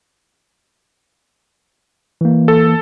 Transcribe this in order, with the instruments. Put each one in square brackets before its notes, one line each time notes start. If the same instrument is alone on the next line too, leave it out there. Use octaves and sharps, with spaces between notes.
[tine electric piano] E3 A#3
[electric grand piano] A4